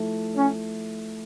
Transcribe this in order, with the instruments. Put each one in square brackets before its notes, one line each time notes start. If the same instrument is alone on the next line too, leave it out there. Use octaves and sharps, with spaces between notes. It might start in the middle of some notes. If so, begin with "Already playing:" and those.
Already playing: [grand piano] F3 A3 E4 A4
[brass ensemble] C#4